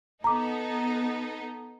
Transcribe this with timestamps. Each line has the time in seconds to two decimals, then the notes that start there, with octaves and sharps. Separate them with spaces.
0.24 B3 D#4 A4 A#5 D6